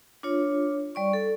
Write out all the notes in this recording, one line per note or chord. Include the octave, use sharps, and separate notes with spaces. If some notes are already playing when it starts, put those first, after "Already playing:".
D4 F4 C#5
G3 D5 C#6
A4